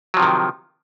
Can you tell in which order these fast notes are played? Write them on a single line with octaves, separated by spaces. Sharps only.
F#3 F3 C3 D#3